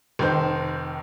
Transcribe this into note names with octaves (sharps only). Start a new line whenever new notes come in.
F1 D#3 C5